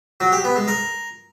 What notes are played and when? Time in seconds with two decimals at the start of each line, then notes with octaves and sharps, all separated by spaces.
0.20 F#3
0.32 G4
0.44 B3
0.56 G#3
0.68 A#4